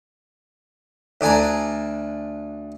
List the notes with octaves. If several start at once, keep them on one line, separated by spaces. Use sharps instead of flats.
D2 D4 G#5 A#5